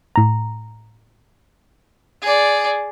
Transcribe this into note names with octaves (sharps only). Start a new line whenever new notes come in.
A2 A#5
G#4 D5